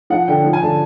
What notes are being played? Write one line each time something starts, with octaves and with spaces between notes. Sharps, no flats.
F3 F#5
D3 G5
F3
G#5
D3 A5